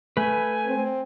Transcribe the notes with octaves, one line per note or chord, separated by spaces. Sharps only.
A3 B4 G#5
C4